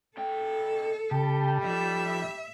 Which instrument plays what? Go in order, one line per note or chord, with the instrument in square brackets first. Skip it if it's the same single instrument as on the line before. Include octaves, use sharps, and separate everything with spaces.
[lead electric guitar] B2 G5 [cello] A4
[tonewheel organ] C#3 A5 [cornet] G3 [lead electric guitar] G4
[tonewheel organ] F3 [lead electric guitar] D#4 A4 [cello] E5